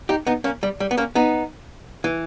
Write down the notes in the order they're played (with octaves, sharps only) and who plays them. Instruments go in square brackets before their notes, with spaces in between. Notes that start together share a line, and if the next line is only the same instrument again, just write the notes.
[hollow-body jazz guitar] D#4 G4
B3 D#4
A#3 C#4
G3
G3
B3
A#3 C#4
B3 D#4
E3